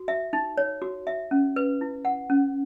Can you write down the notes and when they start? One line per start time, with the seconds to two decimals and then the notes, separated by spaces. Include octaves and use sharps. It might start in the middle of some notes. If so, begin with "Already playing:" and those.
Already playing: F#4
0.08 E5
0.33 D#4
0.58 C#5
0.82 F#4
1.07 E5
1.31 C#4
1.56 B4
1.81 E4
2.05 F#5
2.30 C#4